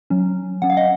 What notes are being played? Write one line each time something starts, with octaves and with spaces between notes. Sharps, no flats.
F#3 C#4
F#3 C#4 F#5
F5
D#5 F#5